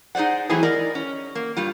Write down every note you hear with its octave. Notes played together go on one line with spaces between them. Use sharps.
D#4 G#4 C5 D5 F#5
E3 F#3 A3 C4 E4 G#4
A#4 D5 D#5
C#4
A#3
G2 G3 F4